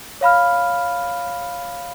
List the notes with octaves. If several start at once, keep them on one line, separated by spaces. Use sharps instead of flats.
C#5 F5 B5 F6